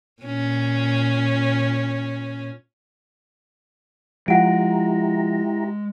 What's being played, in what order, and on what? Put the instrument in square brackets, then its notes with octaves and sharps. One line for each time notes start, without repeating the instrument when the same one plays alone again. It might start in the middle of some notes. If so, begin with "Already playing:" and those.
[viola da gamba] A#2 C#4
[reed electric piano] F3 F4 [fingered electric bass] G#3 [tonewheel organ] E4 G4 A#5 [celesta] F#5 D7